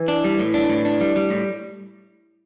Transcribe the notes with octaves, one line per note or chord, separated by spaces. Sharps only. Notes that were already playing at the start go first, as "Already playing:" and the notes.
Already playing: E3
D4
G3
A2
D4
A2
D4
G3
G3
A2